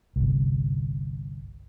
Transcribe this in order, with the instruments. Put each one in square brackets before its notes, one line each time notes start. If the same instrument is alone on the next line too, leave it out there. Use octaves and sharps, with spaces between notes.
[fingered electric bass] G1 C2